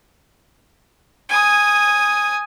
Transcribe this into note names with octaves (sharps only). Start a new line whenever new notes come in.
G#5 D#6